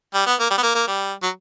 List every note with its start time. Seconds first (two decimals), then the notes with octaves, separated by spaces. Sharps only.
0.14 G3
0.26 B3
0.39 A#3
0.50 G3
0.58 B3
0.63 A#3
0.75 A#3
0.87 G3
1.23 F#3